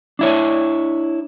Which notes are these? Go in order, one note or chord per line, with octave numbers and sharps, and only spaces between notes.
D4 E4 C#5